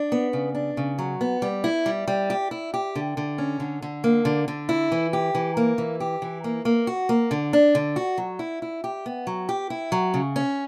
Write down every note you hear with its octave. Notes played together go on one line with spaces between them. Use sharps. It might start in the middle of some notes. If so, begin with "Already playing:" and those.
Already playing: D4
B3
C#3
D4
C#3
F#3
B3
G3
E4
G3
G3
G4
E4
G4
D3
D3
C#4
D3
D3
A#3
D3
D3
E4
E3
G4
E3
A#3
E3
G4
E3
A#3
A#3
F#4
A#3
D3
D4
D3
F#4
F#3
E4
E4
G4
B3
F#3
G4
E4
F#3
C#3
C#4